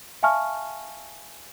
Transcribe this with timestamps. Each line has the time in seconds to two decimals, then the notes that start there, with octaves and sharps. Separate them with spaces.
0.23 E5 F5 G#5 A5 C#6 F6